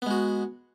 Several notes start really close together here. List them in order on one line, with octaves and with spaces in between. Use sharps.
B3 G#3 F#4